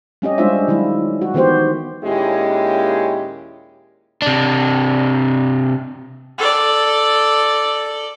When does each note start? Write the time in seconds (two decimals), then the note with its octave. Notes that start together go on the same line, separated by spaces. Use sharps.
0.22 G3 C#4 G4 D#5
0.38 G3 G#3 D4 F4 C5 E5
0.68 D#3 F#3 G#3 E4
1.22 F#4
1.34 D#3 E3 B3 G4 C5
2.04 D#2 A#2 G#3 C#4 E4 G4
4.22 C3 D4
6.38 A4 D5